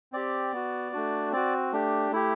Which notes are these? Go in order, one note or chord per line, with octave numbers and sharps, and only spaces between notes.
C4 G4 D5
B3 F#4
A3 D4 F#4
C4 F#4 D5
A3 D4 G4
A3 E4 G4